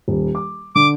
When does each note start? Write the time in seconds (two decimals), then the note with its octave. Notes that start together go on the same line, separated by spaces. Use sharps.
0.08 D#1
0.35 D6
0.76 D3 D6